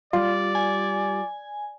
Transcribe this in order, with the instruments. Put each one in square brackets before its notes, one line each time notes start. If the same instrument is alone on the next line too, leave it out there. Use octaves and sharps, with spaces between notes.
[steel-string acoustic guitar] G3 [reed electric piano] F4 [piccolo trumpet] D5
[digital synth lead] G#5